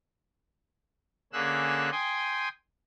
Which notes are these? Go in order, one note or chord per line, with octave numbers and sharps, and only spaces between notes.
D3 A#3 C#4 G#4 E6 F#6
G5 G#5 C6 D#6